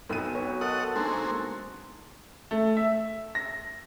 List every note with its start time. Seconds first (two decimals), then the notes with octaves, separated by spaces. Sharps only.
0.09 B1 B2 B3 C4 D#4 D#7
0.35 F#4 B4 C#5
0.61 F#4 A4 A#4 D#5 F#5
0.96 G#3 A#3 C4 D4 D#4
2.51 A3
2.77 E5
3.35 A#6